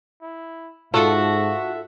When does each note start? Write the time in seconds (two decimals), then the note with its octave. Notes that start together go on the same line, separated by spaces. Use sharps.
0.22 E4
0.94 G#2 F4 F#4 A4 E5